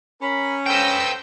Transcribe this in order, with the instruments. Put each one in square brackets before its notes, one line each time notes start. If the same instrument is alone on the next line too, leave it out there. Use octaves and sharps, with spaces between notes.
[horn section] C#4 [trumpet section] A#4 B5
[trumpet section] A4 C5 [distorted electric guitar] B4 G5 [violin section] E6 G6 A#6